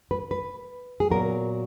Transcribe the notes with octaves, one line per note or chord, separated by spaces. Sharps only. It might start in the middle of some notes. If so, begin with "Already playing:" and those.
B4
B4
G#4
A#2 F#3 B3 A#4